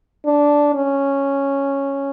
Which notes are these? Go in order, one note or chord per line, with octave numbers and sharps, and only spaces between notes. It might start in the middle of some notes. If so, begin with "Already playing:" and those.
D4
C#4